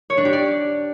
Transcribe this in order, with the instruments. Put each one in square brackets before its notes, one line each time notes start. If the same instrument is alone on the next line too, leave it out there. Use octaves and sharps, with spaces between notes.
[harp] C#5
D4
G4
D5